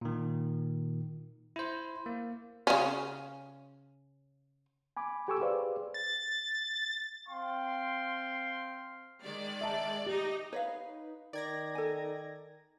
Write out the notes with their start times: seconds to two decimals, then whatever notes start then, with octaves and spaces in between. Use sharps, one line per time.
0.01 A#2 D#3
1.56 E4 C5
2.06 A#3
2.67 C#3 C#4
4.97 G#5 B5 D6
5.28 G4 A4 G#5 C#6 D6 E6
5.41 G4 G#4 B4 C5 D5 F5
5.94 A6
7.29 C4 F5 G5 C6
9.23 D#3 G#3 D5
9.61 E5 A5
10.06 D#4 G4 D#5
10.53 D#4 B4 C#5 F5
11.33 D#3 D5 G#6 A#6
11.75 A4 G#5